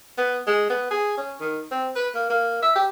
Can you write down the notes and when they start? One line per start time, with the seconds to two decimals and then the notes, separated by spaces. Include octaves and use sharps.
0.18 B3
0.47 G#3
0.70 B3
0.91 G#4
1.17 C#4
1.40 D#3
1.71 C4
1.96 B4
2.14 A#3
2.30 A#3
2.62 E5
2.75 G4